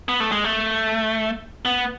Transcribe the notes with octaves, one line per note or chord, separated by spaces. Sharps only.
B3
A3
G#3
A3
B3